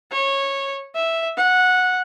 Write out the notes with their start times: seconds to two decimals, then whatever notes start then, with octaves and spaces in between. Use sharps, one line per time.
0.12 C#5
0.95 E5
1.37 F#5